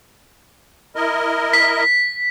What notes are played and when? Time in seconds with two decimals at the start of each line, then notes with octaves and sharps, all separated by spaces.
0.96 E4 A#4 D#5
1.53 B6